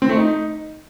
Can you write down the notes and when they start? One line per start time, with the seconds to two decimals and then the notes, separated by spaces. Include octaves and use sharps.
0.02 C4
0.09 A3
0.17 D#4